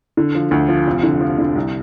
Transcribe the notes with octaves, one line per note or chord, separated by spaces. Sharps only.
D3
F3
D2
F3
F1
D3
F3
D3
C2